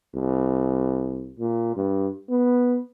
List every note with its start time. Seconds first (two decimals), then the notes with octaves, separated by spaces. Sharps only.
0.15 C2
1.39 A#2
1.76 G2
2.30 B3